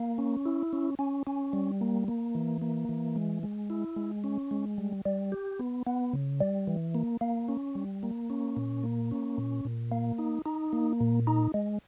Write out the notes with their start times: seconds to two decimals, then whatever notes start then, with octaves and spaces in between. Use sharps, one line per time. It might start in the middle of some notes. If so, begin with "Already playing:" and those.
Already playing: A#3
0.18 C#4
0.46 E4
0.73 C#4
0.99 C#4
1.27 C#4
1.53 G3
1.81 A#3
2.08 A#3
2.35 E3
2.62 A#3
2.89 E3
3.16 G#3
3.43 G#3
3.70 E4
3.96 G#3
4.24 C#4
4.51 G#3
4.78 G3
5.05 G3
5.32 G4
5.59 B3
5.87 B3
6.13 C#3
6.41 G3
6.67 E3
6.94 A#3
7.21 A#3
7.49 C#4
7.75 G3
8.03 A#3
8.30 C#4
8.57 A#2
8.84 A#3
9.11 C#4
9.38 A#2
9.65 A#2
9.92 A#3
10.18 D#4
10.46 D#4
10.73 A#3
11.01 A#2
11.27 D#4
11.54 G#3